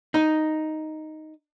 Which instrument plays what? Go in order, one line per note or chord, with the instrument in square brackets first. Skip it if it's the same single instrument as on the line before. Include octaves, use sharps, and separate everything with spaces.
[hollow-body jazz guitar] D#4